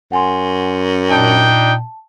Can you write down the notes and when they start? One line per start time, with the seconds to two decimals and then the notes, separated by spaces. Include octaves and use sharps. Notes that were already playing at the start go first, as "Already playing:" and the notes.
0.12 F#2 F#5 G#5 C6
1.11 A#2 D4 D#4 G5 A5